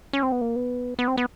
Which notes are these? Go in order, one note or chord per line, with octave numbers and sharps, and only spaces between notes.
C#4
C4
B3
A#3
B3
B3
C4
B3